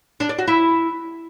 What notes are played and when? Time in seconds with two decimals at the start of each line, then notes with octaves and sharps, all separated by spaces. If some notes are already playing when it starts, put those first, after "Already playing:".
0.20 D4
0.29 D5
0.38 F#4
0.48 E4